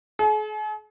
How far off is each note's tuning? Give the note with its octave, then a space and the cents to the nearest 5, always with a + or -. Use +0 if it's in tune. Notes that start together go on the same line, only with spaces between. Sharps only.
G#4 +45